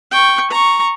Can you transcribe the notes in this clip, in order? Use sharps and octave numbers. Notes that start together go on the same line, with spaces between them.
G5 C#6
A#5 C#6